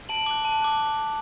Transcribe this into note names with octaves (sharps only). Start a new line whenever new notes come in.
A5 D7 F#7
D6 F#6
A5
D6 F#6